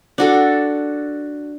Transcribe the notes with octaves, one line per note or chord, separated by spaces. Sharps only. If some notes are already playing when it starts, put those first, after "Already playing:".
D4 F#4 A4